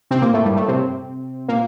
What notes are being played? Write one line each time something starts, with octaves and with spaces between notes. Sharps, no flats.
C3 C4
A#2 A#3
A2 A3
G2 G3
A2 A3
C3 C4
A#2 A#3